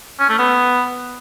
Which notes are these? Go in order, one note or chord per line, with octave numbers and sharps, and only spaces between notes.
C#4
A3
B3